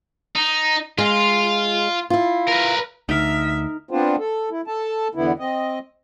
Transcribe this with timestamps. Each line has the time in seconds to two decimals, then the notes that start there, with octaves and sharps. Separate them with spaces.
0.36 D#4
0.98 G#3 F4
2.10 E4 F4
2.48 A#4 B4
3.09 D2 D#4 A#4 E5
3.91 B3 C4 D4 F4 C5
4.19 A4
4.51 E4
4.67 A4 A5
5.15 E2 D3 B3 E4
5.39 C4 D#5